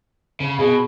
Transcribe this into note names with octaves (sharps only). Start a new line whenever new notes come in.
C#3
B2 G#4